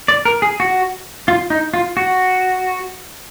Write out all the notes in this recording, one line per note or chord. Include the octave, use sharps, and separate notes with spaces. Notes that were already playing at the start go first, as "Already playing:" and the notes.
D5
A#4
G#4
F#4
F4
D#4
F4
F#4